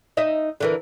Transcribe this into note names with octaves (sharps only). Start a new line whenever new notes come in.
D#4 D#5 E5
D3 E3 A#4